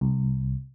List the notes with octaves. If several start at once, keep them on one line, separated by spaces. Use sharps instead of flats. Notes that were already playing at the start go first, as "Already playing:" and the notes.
C2